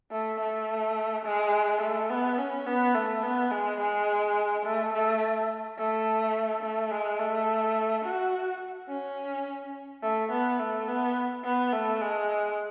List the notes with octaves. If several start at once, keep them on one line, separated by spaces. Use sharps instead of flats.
A3
A3
G#3
A3
B3
C#4
B3
A3
B3
G#3
G#3
A3
A3
A3
A3
G#3
A3
F#4
C#4
A3
B3
A3
B3
B3
A3
G#3